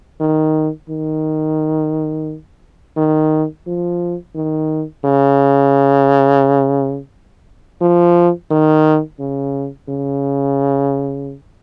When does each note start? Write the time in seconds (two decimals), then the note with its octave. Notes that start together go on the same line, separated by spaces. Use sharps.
0.20 D#3
0.90 D#3
2.97 D#3
3.67 F3
4.36 D#3
5.05 C#3
7.81 F3
8.51 D#3
9.19 C#3
9.89 C#3